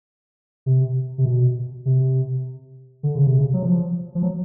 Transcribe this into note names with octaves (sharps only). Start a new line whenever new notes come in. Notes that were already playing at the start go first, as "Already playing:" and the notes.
C3
C3
B2
C3
D3
C#3
C3
C#3
F#3
F3
F3
F#3